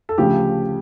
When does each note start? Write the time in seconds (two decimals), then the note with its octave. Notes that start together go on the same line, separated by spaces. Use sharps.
0.09 A4
0.18 D2 C#3 F3 A3 G4